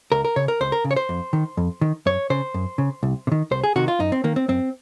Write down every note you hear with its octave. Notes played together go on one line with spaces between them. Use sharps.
C#2 A#4
A#4
C#3 C#5
A#4
C#2 C5
A#4
C#3
C#5
C5
F2
D#3
F2
D#3
F#2 C#5
C#3 C5
F#2
C#3
C2
C3
D#3
C2 C5
G#4
C3 D#3 F#4
F4
F#2 D#4
C4
D#3 A#3
C4
F#2 C4